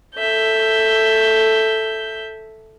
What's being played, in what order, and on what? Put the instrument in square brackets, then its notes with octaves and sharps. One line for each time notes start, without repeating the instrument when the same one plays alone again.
[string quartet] A4 E5 G6